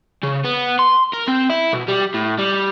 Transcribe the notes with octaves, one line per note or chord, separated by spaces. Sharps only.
C#3
B3
C6
A#4
C4
E4
B2
G3
A2
G3